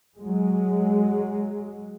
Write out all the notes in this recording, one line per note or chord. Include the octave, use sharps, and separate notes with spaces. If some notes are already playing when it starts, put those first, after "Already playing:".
F#3 G#3